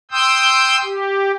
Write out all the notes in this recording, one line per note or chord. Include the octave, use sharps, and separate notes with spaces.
G5 C6 D#6 E6 G6
G4